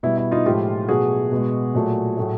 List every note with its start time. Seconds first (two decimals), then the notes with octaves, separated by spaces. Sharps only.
0.03 B2 G3 E4
0.18 E4
0.31 D#4 F4
0.45 A2 F3 G#3 F4 G4
0.88 B2 F#3 A3 F#4 G#4
1.31 B2 G#3
1.74 A#2 F#3 A3
2.17 A2 F#3 A3